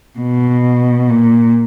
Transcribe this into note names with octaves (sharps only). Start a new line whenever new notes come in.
B2
A#2